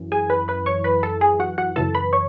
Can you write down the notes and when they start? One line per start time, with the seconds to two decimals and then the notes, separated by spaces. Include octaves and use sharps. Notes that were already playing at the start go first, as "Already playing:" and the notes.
Already playing: F#2 E3
0.12 G#4 G#5
0.30 B4 B5
0.48 B4 B5
0.66 C#5 C#6
0.84 B4 B5
1.03 A4 A5
1.21 G#4 G#5
1.40 F#4 F#5
1.58 F#4 F#5
1.76 F#2 C#3 E3 A4 A5
1.95 B4 B5
2.13 C#5 C#6